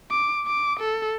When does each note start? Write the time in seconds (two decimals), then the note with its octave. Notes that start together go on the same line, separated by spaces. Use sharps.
0.11 D6
0.46 D6
0.80 A4